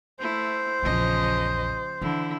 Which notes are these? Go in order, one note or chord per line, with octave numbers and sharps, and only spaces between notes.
A3 E4 C5
A#1 E2 C#3 F3 D#5
D3 E3 E4